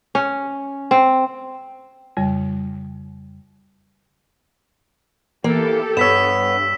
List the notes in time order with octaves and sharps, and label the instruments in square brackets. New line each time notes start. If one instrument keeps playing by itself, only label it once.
[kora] C#4
C4
[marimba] F2 C#3 G3
[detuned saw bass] E3 [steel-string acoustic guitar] A#3 [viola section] G4 A4
[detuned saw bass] G2 [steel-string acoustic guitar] B3 C#5 [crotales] E6 B6 E7